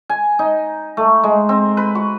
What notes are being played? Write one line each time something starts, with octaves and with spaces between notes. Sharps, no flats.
G#5
D#4
A3
G#3
C4
B4
F#4